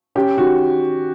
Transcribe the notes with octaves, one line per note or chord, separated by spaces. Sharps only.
C#4 G4
D#3 F#4